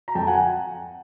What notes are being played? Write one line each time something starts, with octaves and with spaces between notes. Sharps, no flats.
A#5
F2 G5 A5
F#5 G#5